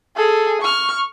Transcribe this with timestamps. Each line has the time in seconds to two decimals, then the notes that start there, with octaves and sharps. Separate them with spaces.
0.16 G#4 A4
0.62 C#6 F6